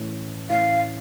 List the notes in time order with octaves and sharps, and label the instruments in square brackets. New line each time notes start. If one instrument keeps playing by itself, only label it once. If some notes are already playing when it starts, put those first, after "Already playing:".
Already playing: [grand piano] A2 E3 A3 C#4
[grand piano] A2 E3 A3 C#4 E4 [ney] F5